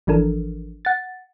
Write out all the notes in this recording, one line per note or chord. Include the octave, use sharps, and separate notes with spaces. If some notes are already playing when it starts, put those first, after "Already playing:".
G#1 E3 F3 D4 A4 A#4
F#5 A6